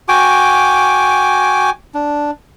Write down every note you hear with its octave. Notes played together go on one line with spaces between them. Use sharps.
F#4 G5 G#5 D6
D4